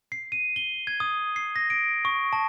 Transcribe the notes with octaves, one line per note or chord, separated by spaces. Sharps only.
C7
D#7
G7
G#6
D#6
C7
A#6
D7
C#6
A5